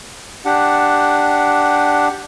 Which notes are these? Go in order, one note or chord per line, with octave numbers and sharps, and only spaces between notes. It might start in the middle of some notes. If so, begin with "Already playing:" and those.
D4 G4 F#5